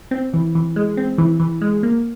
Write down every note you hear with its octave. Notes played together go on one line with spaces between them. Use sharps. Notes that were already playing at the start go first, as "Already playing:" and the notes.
C4
E3
E3
G#3
C4
E3
E3
G#3
A#3